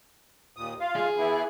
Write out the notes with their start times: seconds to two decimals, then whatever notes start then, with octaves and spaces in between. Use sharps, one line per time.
0.57 D#2 A#2 D#6
0.80 F4 F5
0.96 G#4
1.17 E3 B3 E4